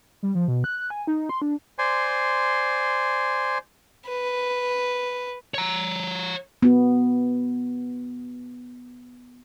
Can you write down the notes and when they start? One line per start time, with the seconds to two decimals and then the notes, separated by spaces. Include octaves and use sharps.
0.23 G3
0.35 F3
0.48 B2
0.64 F#6
0.76 F#6
0.90 G#5
1.07 D#4
1.29 C6
1.42 D4
1.79 C5 D5 G#5 C6
4.09 B4
5.54 C#5 A#5
6.62 B3 F#4